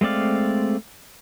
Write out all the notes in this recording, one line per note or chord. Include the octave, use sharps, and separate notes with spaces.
G#3 A3 C4 D5 F5